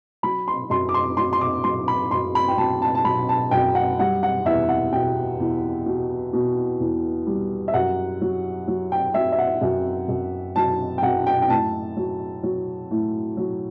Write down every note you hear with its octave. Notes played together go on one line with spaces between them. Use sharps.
F#3 B5
C6
F#2 C6
D6
C6
F#3 C6
C6
D6
F#3 C6
B5
F#2 C6
B5
G5
F#3 A5
A5
A5
F#3 B5
A5
F#2 G5
F#5
G3 F#5
F#5
E2 E5
F#5
B2 G5
E2
B2
B2
E2
G3
E5
F#2 F#5
F#3
F#3
G5
F#3 E5
E5
F#5
F#2
F#2
F#3 A5
G5
F#2 F#5
G5
G5
A2 A5
F#3
F#3
A2
F#3